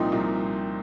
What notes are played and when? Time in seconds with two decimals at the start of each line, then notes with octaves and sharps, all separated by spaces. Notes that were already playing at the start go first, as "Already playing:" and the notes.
Already playing: C2 A#2 F3 C4 D#4
0.12 C2 A#2 F3